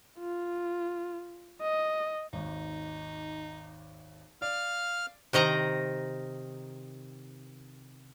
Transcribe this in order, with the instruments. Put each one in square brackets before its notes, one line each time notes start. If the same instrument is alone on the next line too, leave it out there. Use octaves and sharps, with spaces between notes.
[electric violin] F4
D#5
[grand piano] G#1 D#2 [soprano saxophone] D#4
[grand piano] D5 [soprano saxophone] F5 [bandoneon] F6
[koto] C3 D#3 D#5 A#5